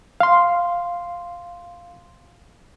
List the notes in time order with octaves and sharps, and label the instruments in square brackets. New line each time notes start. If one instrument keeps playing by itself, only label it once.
[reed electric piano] F5 C6